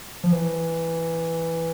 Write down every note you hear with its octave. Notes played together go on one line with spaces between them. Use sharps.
F3
E3